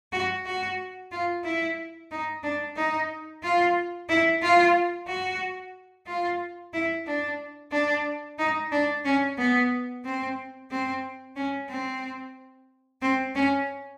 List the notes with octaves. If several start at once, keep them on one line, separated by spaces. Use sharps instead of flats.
F#4
F#4
F4
E4
D#4
D4
D#4
F4
E4
F4
F#4
F4
E4
D4
D4
D#4
D4
C#4
B3
C4
C4
C#4
C4
C4
C#4